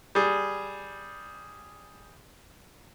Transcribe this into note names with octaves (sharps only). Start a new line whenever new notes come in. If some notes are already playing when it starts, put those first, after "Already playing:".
G3 G#4